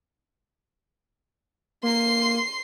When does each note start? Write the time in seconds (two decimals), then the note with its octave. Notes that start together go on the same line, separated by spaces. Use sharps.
1.83 A#3 C6 C7